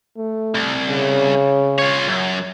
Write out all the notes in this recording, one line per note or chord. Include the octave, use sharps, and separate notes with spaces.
A3
C2
C#3
F4 C#5
F#2